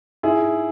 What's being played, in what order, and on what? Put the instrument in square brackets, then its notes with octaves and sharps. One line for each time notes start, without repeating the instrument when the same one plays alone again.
[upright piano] G#2 E4 G#4